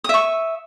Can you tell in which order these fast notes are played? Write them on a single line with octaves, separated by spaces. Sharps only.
D#6 E5 C#6